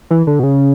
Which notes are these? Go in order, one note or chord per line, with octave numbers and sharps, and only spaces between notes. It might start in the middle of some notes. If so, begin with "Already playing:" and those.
E3
D3
B2
C#3